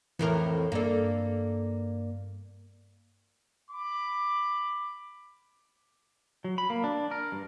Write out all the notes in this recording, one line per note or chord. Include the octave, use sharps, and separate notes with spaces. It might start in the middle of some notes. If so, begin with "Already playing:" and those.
F2 A2 E3 A#4
G2 A#3 A4 D5
B5 D6
F#3
B5
A#3
D4
A#4
G2